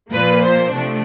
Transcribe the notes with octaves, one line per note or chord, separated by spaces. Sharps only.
A#2 F3 A#3 B4
C5
C3 F3 A3 D4